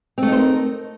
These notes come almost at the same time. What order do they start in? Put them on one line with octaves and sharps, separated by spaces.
C4 A3 D#4 C5 A#4